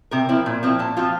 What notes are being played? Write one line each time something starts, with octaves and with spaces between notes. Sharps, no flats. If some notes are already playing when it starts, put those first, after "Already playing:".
C3 A#4
F3 C4 E4
A#2
F3 C4 E4
A#2 A5
F3 C4 F4